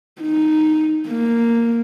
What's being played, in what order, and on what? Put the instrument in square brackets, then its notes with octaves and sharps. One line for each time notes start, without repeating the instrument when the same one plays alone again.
[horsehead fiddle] D#4
A#3